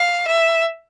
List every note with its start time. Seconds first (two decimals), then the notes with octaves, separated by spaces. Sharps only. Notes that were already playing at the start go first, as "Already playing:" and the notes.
Already playing: F5
0.27 E5